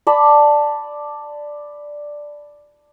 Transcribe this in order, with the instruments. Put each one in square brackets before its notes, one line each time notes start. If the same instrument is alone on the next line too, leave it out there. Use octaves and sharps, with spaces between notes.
[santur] D5 A5 B5